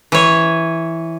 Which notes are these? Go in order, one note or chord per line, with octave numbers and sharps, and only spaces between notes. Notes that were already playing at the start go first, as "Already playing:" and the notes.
E3 C#5